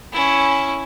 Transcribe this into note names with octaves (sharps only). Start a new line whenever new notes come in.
C#4 E4